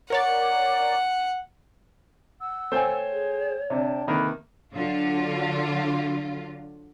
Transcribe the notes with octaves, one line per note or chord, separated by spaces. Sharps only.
A#4 C#5 D5 F#5
F#5 E6
A3 C5 C#5 G5 G#5
G#4
C3 D4 G5 A5
C3 D#3 A#3 A4 B4 B5
D3 F#3 F4